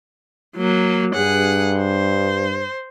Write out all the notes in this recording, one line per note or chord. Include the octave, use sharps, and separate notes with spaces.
F#3 A#3
G2 G#4 F#5
C5